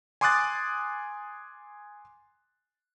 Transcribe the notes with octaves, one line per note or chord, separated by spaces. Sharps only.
G#5 C6 D6 D#6 F#6 A6